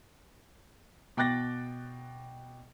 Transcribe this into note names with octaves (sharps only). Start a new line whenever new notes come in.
B2 G5 D6 F#6 A6 A#6